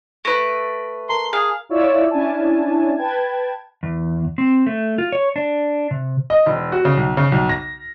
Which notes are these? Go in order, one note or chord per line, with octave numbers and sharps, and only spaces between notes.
A3 B4 A#6 D7 D#7
A#4 A5 A#5 C6
G#4 F5
E4 F4 C#5 D5 E5 E6
C#4 D4 E4 G#5 A5
B4 G5 A5 G#6
E2
C4
A3
F4
C#5
D4
C3
D#5
E1
F#4
C#3
B1
C#3
B1
A#6